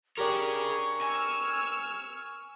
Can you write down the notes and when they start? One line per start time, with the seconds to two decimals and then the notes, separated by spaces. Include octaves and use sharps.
0.18 D4 G4 G#4 A#4 C#5 C#6
1.02 G#5 E6 F6